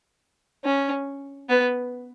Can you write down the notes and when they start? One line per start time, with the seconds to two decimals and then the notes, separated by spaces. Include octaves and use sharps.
0.64 C#4
1.50 B3